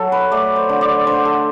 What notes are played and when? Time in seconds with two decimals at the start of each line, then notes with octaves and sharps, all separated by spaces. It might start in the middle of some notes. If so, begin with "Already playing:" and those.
Already playing: F#3 A4
0.12 B4
0.32 A3 D5
0.56 C5
0.69 D3
0.81 D5
1.07 D3 C5
1.25 A4